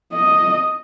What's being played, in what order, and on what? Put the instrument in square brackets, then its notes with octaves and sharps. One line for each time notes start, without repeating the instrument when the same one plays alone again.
[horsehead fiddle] D#5